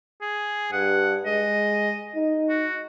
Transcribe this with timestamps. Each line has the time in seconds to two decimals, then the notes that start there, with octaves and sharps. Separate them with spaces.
0.21 G#4
0.72 G2 F#5
1.26 G#3 D#5
2.16 D#4
2.50 F#4